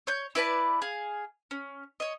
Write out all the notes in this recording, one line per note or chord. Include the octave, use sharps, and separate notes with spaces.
C#5 G6
E4 B4 D5 A5
G#4 F5
C#4
C#5 D#5